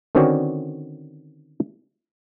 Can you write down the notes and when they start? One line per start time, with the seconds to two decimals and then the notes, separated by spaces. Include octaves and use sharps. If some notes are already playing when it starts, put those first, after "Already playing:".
0.15 D3 D#3 C4 C#4 F#4 D5